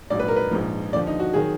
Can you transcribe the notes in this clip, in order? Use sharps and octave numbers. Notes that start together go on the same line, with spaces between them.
A#1 G#2 F#3 D5
B4
A#4
B4
A#1 G#2 F3
D#2 D3 F3 D5
D#4
F#4
D#3 F#3 G#4